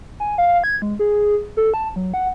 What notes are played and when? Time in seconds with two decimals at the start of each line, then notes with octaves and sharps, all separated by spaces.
0.20 G#5
0.38 F5
0.64 G#6
0.82 G#3
0.99 G#4
1.57 A4
1.74 A5
1.96 F#3
2.14 F#5